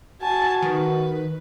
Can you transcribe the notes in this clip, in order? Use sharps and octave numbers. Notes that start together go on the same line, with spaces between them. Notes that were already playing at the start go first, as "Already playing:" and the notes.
F#4 G#5 A5
D#3 B4